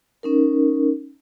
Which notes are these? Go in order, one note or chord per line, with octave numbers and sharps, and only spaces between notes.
C#4 D#4 A#4